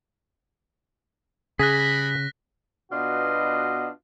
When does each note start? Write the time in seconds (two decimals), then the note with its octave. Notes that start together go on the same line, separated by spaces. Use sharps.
1.59 C#3 G3 G#4 B5 F#6 A#6 B6
2.91 B2 B3 D4 F4 F#4 D#5